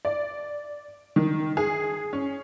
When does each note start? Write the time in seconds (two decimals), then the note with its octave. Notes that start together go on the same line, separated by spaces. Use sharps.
0.05 D5
1.16 D#3
1.57 G#4
2.13 C#4